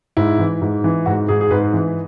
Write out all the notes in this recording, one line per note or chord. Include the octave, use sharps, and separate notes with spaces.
G#2 E4
E3
G#2
E3
G#2 F#4
G#2 G#4
G#4
G#2 B4
E3